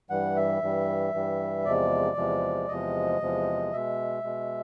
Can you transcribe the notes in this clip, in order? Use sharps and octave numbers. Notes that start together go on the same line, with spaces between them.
G2 E3 G3 F#5
E5
G2 E3 G3
G2 E3 G3
E2 C3 F3 G#3 D5
E2 C3 F3 G#3
E2 C3 F3 G#3 D#5
E2 C3 F3 G#3
B2 G#3 E5
B2 G#3